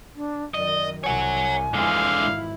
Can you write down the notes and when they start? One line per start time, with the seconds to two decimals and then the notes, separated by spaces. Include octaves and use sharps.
0.16 D4
0.54 F#2 D#3 D5 D#5
1.04 C2 C#5 F#5 G#5
1.74 F2 D3 E3 G#3 F5
2.19 G#1 E4